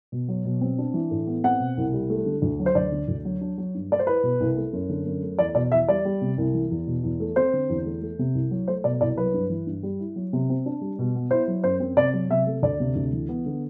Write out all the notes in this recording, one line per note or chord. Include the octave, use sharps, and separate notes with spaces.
B2
F#3
B2
C4
D4
E3
A2
B3
C4 F#5
B2
C2
G3
A3
D3
D2
F#3
C5
D2 D5
D3
D2
F#3
D4
F#3
G2
A3 D5
C5
E4 B4
B2
C2
A3
F#2
D3
F#2
A3
E2 D5
B2 D5
E2 E5
G3 D5
G3
C3
C2
E3
E2
B2
E2
A3
C4 C5
D3
E2
A3
A3
C3
C2
F#3
A3 C5
B2 D5
C2 D5
F#3 B4
G2
E3
G2
G3
E4
F#3
C3
C4
D4
G3
B2
B3
E4 C5
F#3
F#2 C5
C4
C3 D5
F#3
C3 E5
A3
D2 D5
C3
D2
E3
B3
D3